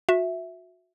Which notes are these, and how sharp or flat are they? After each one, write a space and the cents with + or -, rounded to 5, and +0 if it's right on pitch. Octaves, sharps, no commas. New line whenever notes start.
F#4 -30 E5 +0